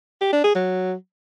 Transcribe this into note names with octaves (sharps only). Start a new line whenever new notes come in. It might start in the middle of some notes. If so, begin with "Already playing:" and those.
G4
D4
G#4
F#3